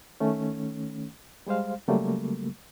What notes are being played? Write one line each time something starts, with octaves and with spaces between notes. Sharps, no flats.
D#3 A3 C#4
G3 G#3 C5 F5
C#3 F#3 G3 A3 A#3